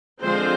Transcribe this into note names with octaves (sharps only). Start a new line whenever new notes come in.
D3 F3 G#3 C4 F4 C5